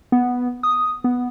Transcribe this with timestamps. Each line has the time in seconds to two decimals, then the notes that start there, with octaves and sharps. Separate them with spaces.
0.12 B3
0.63 D#6
1.04 B3